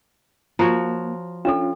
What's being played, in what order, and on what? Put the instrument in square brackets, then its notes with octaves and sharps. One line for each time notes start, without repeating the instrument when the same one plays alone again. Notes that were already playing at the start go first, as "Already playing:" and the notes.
[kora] F3 F#4 C#5 [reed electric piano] A#3 [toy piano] A#5
[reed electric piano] C#4 F4 [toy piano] D4 A4